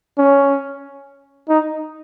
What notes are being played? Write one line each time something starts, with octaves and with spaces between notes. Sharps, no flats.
C#4
D#4